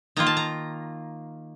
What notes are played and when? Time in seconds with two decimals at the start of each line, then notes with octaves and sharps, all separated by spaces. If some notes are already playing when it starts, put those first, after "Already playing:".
0.16 D#3 A#3 F4 A#5
0.27 A5
0.37 A#5